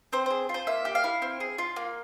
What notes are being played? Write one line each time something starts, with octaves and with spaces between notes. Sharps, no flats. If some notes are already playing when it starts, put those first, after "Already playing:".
C4 C5
G#4 C5
F4
C5
A#3 E5
G4
F5
E4
C4
G#4
F4
A#3